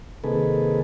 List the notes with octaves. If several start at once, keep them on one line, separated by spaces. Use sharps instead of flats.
C3 D#3 A#3 G#4 A4 B4